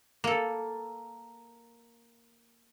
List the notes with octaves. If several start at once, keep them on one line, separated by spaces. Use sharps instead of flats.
A#3 A4